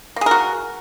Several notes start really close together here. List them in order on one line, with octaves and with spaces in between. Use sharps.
A#3 G#4 A#4 F#4